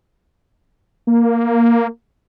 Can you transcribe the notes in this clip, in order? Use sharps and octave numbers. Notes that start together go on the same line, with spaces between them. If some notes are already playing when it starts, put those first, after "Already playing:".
A#3